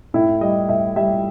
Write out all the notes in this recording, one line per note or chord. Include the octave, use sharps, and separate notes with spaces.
A2 E4
G3 D#5
A2 E5
G3 E5